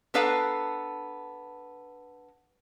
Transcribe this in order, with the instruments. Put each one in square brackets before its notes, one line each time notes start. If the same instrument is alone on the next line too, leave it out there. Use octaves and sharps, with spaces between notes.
[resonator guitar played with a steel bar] B3 D4 A4 B4 F5 A#5